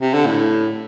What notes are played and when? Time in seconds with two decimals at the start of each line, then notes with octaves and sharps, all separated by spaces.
0.01 C3
0.14 D3
0.26 A2